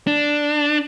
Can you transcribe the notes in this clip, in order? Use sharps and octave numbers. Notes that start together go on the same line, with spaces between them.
D4